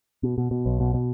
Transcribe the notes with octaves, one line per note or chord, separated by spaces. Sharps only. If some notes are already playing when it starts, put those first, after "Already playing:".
B2
B2
B2
B1
B2
B2